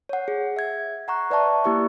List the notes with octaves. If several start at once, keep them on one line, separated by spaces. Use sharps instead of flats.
C#5 F#5
G#4
E5 G#6
F#5 A#5 C#6 F#6
B4 D5 E5 A5 C#6
A#3 E4 G4 D5 C#6